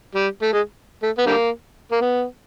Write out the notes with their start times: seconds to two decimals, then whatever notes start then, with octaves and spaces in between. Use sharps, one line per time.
0.15 G3
0.42 A3
0.53 G#3
1.03 A3
1.18 B3
1.26 D3 G3 A#3
1.92 A#3
2.01 B3